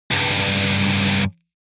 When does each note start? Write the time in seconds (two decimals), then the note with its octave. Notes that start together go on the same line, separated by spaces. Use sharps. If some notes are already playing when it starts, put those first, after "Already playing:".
0.11 C#2 G2